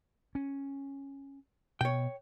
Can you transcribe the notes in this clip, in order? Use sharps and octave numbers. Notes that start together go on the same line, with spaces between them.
C#4
B2 C#5 G5